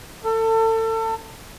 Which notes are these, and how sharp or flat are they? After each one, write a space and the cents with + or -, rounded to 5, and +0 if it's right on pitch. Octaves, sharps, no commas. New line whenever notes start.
A4 +30